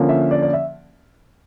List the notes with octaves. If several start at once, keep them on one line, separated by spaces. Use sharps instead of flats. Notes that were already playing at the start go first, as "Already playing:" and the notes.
Already playing: D3 F3 A#3 C#4
E5
D5
D5
E5